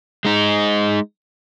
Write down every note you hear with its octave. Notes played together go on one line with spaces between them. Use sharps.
G#3 D#4